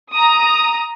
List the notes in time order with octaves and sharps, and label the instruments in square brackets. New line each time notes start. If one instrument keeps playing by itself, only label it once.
[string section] A#5 D#6